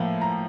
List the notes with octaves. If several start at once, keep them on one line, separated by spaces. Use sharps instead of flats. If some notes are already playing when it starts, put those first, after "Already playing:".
Already playing: A2 F3 A#3
A#5